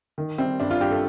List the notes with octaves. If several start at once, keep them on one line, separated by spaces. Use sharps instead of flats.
D#3
G3 C4
G2 D4
F4
G2 G4
A4